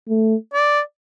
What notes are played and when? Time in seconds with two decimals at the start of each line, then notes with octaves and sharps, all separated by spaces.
0.09 A3
0.54 D5